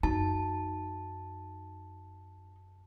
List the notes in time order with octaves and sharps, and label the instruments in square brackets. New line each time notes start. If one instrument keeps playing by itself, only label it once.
[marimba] F#2 [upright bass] D#4 [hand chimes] A5